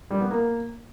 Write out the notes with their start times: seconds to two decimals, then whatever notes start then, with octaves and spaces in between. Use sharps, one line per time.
0.11 G3
0.21 B3
0.31 A#3